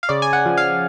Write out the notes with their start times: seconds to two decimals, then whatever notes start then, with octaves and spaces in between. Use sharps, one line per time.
0.03 F5
0.09 C#3 D5
0.22 G#5
0.33 F#5
0.46 F3
0.57 F5